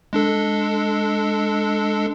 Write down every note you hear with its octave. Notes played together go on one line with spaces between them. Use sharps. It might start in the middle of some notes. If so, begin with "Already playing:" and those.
G#3 D4 A4